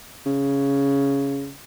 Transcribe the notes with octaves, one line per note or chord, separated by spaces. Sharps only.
C#3